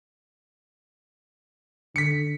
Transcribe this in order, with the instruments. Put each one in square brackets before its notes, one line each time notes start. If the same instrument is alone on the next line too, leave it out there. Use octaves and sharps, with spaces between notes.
[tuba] D3 [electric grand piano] B6 C#7